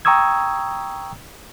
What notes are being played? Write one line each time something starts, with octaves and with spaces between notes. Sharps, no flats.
G5 A#5 C#6 D#6 E6 G#6